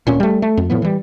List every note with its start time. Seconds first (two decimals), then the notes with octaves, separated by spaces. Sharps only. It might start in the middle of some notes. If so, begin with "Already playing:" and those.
0.07 D1 A#2 C#4
0.20 G3 A3
0.42 A3
0.57 F2
0.70 A2 F3 B3
0.82 E3 G3